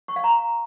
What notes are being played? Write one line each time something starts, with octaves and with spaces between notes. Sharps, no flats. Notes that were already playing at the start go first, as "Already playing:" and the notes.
C#6
F5
A#5